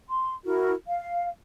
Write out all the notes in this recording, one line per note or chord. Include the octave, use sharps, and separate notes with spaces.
C6
E4 F#4 A#4
F5